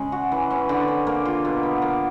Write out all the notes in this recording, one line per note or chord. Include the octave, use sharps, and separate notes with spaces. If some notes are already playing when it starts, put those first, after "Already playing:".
Already playing: C#3 G#3
F#4
E3
C#4
D3
C4
A#3
F4
B2
B3
A#3